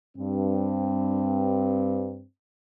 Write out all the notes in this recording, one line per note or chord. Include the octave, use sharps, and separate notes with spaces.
G2 C4